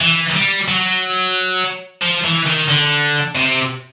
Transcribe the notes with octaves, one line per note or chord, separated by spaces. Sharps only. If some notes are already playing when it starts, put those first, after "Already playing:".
E3
G3
F#3
F3
E3
D#3
D3
C3